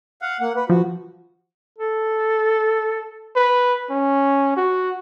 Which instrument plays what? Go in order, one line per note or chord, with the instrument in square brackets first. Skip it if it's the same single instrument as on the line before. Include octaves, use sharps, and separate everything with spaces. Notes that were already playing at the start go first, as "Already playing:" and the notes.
[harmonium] F5 F#5
A#3 F#5
B4
[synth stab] F3 [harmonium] F#4
[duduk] A4
[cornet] B4
C#4
F#4